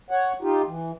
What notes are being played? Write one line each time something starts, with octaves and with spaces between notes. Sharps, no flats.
C#5 F#5
D#4 F4 G4
E3